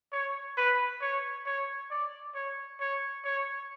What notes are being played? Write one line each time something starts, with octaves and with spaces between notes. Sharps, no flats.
C#5
B4
C#5
C#5
D5
C#5
C#5
C#5